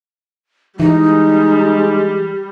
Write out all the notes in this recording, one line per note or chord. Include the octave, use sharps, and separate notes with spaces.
E3 G3 G#3 D#4